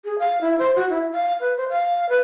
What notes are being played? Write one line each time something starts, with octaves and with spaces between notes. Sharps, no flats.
G#4
F5
E4
C5
F#4
E4
F5
B4
C5
F5
B4